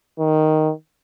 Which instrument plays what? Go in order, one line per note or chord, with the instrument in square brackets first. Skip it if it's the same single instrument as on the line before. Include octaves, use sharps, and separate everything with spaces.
[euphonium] D#3